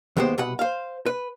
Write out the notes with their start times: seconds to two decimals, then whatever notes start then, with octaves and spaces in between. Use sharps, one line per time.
0.17 D#2 G#3 B3 G4 C5
0.38 C2 B2 B4 F#5
0.59 C5 F5
1.06 B4